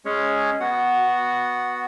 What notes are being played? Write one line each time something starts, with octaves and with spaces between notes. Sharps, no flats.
G#3 C#4 G#4 C#5
B3 F#4 F#5